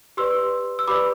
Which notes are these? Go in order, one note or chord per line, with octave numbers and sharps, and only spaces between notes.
G4 B4 D5 C6 E6
E6
G4 B4 D5 B5 D6